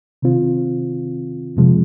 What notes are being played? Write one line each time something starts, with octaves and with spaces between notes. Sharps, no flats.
C3 D#3 C4 F4
F2 C3 F3 G#3